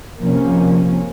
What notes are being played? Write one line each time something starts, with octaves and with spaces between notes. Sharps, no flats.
C3 F3 A#3 C#4